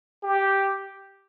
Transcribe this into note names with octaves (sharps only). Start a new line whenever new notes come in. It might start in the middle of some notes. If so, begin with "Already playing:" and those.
G4